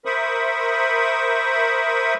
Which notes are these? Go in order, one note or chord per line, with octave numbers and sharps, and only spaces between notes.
A#4 C5 E5 B5 C#6 D#6